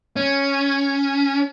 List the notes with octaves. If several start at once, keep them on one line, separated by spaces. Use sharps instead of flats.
C#4